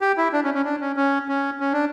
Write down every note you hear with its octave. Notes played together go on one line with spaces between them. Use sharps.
G4
E4
D4
C#4
C#4
D4
C#4
C#4
C#4
C#4
D4